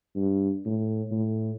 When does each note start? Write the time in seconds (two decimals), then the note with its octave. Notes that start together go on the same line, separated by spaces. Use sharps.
0.16 G2
0.65 A2
1.11 A2